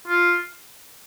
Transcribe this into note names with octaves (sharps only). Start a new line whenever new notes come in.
F4